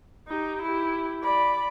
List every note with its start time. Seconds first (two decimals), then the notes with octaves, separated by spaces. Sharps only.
0.28 D#4 G4
0.62 E4 G4
1.23 D5 B5